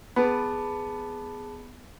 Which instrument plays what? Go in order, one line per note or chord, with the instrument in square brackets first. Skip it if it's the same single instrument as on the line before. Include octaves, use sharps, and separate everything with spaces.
[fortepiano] B3 [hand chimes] G#4 A5 B5